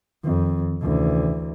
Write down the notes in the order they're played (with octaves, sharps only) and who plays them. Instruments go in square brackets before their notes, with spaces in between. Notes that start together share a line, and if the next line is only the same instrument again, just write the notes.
[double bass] F2 [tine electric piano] D#3 C4
[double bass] D2 E3 [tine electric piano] C3 D#3 C#4